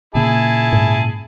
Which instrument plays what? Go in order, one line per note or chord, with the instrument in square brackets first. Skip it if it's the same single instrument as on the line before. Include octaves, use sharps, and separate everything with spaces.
[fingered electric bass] A#2 C#3 A#3 [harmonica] E4 G#4 A5
[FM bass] G#2